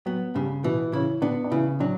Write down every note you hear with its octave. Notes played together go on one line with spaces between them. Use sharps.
F#3 B3
G2 C#3 G3
B2 E3 B3
C#3 C#4 E4
D3 B3 D4
D4
C#3 E3 E4
D3 F#3 D4